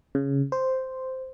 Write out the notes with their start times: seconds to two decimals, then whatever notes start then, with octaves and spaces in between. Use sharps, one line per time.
0.15 C#3
0.52 C5